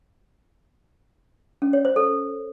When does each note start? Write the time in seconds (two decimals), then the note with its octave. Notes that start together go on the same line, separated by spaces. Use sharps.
1.62 C#4
1.73 C#5
1.85 C5
1.96 A4